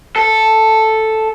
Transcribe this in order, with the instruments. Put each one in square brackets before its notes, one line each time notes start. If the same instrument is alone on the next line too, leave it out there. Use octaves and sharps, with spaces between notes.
[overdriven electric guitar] A4